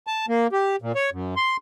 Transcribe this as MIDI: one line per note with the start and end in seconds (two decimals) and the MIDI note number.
0.07 0.26 81
0.28 0.47 58
0.52 0.76 67
0.82 0.92 46
0.95 1.10 73
1.12 1.34 42
1.36 1.57 84